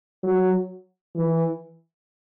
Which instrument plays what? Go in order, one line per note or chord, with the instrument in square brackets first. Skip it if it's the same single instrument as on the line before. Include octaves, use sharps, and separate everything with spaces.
[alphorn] F#3
E3